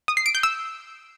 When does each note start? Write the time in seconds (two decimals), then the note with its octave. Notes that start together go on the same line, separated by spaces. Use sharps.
0.08 D#6
0.17 C7
0.26 D7
0.35 G6
0.43 E6